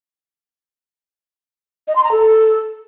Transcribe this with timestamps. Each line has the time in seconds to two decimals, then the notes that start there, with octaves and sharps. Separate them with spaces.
1.88 D#5
1.96 C6
2.04 A#5
2.12 A4